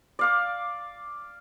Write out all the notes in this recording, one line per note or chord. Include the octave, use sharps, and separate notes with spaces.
D5 F5 D6